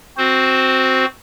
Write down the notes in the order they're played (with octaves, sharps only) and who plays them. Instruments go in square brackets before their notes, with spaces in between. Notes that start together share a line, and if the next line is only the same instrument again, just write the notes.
[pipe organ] C4 F#4 C5